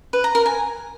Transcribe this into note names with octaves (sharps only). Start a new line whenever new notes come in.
B4
A#5
A#4
G#5